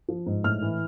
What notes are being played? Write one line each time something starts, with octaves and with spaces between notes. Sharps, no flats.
F3
G#2
A2 F6
E3